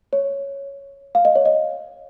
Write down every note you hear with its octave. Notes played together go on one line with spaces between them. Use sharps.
C#5
F5
D#5
C#5
D#5